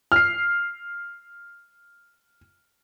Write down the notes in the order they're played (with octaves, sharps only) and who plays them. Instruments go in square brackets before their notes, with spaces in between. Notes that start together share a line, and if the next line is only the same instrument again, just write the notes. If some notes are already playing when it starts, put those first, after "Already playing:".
[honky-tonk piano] F6 C7